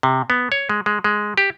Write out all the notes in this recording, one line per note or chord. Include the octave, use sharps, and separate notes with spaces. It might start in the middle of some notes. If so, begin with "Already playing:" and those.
C3
B3
C#5
G#3
G#3
G#3
G4